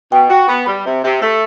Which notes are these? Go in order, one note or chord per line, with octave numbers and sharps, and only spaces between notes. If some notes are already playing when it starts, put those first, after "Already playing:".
B2 G5
F#4 G5
B3 B5
G3 B5
C3
C3
A3